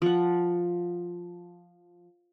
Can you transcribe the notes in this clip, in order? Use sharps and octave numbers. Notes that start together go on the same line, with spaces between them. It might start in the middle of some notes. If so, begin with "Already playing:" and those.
F3 F#5